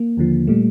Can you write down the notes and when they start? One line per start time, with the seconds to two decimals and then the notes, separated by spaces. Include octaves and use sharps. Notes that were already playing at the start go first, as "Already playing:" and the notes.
Already playing: A#3
0.17 D#2 D3 F3
0.47 A#2 G3 A3